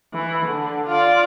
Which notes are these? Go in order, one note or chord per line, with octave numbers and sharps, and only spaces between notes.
E3
D3
F4 D5